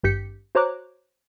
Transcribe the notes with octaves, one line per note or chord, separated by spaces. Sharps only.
G#1 G2 G4 G6 B6 C#7
F#4 C5 C#5 A#5 D6 F#6